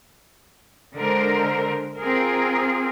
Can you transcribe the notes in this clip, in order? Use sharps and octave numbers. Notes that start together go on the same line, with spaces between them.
D3 G#3 A#4 C5
C4 F4 G#4 A#4